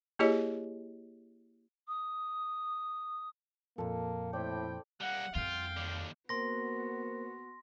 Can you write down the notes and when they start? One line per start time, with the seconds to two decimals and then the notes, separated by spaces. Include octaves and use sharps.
0.19 A#3 E4 G4 G#4 C#5 D#5
1.88 D#6
3.78 F2 A#2 A#3 A4
4.33 A2 C4 E4 D5 G5
5.01 G3 A#3 F#5
5.35 F2 G3 F4 F5 G5
5.77 D#2 D3
6.29 A#3 B3 F#4 A#4 C5 C6 A#6